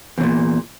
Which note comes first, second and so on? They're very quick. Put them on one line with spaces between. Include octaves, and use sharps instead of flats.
E2 C#3 A#2